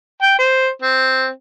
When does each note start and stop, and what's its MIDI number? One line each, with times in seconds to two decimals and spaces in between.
0.22 0.34 79
0.39 0.68 72
0.82 1.28 60